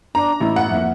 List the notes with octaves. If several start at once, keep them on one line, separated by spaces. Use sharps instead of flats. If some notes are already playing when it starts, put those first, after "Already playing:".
D4 A#5
A1 E4
F#5
F2 A#3 E5